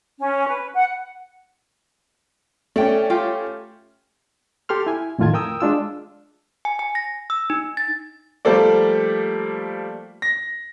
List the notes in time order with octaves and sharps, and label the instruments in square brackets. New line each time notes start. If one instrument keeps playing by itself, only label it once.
[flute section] C#4
B4
F#5
[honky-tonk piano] A3 C#4 [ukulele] D5 G5
[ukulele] F4 G4
[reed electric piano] G4 A4 C6 F6
E4 G#5
F2 A2 D#3 F4 A5 G#6
A#4 G5 D#6 E6
G#3 D4 F4 E6
[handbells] G#5
G#5
A#6
E6
D#4
A6
[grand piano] F3 G3 A3 A#3 A4 D5
A#6